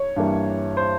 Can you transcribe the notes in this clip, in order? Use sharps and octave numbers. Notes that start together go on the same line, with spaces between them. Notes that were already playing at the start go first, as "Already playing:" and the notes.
Already playing: C#5
G2 E3 G3 A#3
C5